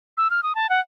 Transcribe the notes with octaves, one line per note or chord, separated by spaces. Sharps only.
E6
F6
D#6
A5
F#5